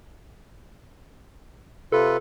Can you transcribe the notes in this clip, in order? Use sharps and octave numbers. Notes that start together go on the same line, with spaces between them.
C3 F4 A4 B4